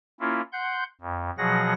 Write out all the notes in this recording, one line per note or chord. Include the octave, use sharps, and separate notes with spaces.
A#3 C#4 E4 F4
F#5 C6 G6
F2
B2 F3 F#3 G#4 F#5 A#6